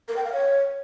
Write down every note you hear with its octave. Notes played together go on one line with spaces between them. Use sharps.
A#4
G5
F5
C#5